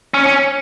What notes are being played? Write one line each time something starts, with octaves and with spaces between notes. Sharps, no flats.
C#4
C#4